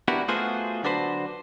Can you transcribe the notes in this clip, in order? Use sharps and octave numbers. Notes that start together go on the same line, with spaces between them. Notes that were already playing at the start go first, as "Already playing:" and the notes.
B3 D4 E4 F#4 G4 A#4
A3 B3 F4 F#4 G#4 C5
D3 F#3 D4 F#4 B4 C5